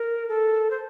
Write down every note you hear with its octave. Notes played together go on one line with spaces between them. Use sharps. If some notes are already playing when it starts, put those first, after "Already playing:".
Already playing: A#4
A4
C5